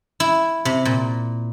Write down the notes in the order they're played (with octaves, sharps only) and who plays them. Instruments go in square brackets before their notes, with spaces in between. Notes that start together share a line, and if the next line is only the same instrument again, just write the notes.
[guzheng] E4
C3
A#2